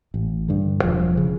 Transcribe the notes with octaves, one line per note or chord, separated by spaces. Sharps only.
A1
G2 D3
E1 F3
C#3